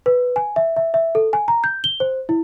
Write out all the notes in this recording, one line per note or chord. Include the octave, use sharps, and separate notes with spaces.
B4
G#5
E5
E5
E5
A4
G#5
A#5
G6
G7
C5
E4